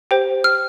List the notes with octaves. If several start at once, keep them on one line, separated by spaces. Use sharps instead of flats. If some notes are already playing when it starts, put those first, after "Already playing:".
G4 C5 G5
F6